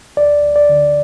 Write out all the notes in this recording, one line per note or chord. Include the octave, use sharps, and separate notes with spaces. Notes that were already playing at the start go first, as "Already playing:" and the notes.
D2 D5
D2
D5
D3